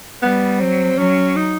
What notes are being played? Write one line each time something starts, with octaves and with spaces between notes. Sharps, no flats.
G3 B3
F#3 C4
F#3 C#4
D#4